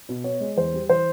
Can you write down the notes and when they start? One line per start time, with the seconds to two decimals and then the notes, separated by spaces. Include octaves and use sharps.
0.09 B2
0.24 B3 C#5
0.41 G#3
0.57 E2 C5
0.73 G3
0.89 E3 C5